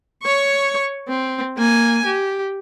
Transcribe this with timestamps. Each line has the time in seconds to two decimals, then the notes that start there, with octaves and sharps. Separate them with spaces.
0.23 C#5 C#6
1.08 C4
1.58 A#3 G#5
2.06 G4